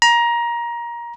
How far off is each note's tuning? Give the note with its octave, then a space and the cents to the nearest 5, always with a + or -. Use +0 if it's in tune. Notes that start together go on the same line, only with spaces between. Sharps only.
A#5 +20